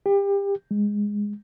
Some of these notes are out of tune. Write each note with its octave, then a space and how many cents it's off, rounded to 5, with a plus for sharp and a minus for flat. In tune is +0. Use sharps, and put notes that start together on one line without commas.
G4 +30
G#3 -10